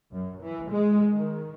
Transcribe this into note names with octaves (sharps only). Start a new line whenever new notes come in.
F#2
E3
G#3
D#3